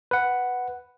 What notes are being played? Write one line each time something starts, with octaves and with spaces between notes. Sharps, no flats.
B4 F#5